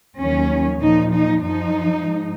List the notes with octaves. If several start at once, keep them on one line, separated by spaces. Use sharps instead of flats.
D#2 D#3 F#3 C#4
A#2 F3 D#4
D#4
F#2 F3 D#4
G#2